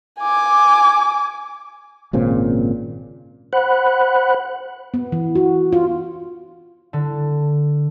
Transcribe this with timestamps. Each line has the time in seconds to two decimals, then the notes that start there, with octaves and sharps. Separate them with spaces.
0.20 G#5 D6
2.13 G#1 A#2 C#3 C4
3.53 C5 F#5 B5 F#6
4.94 B3
5.12 E3
5.35 F#4
5.73 F4
6.93 D3